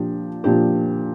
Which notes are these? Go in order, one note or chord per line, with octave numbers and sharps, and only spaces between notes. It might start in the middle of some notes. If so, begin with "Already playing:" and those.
Already playing: A#2 F3 D4 G4
A#2 F3 D4 G4